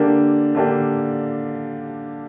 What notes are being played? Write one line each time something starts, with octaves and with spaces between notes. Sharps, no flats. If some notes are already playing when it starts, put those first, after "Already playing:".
Already playing: D3 A#3 D4 G4
D3 A#3 D4 G4